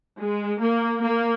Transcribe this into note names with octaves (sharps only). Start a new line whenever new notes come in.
G#3
A#3
A#3